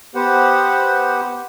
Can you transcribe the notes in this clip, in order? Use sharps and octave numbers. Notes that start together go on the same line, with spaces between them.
B3 G4 B4 C5 F#5